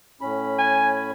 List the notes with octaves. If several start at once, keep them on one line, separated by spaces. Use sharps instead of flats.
A2 C#4 B5
G#5